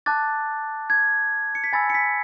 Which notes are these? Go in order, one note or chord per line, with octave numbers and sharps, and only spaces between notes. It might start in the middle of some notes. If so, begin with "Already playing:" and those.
A5 D6 F#6 A6
G#6
C#7
B6
G#5 B5 E6 A6
C#7
B6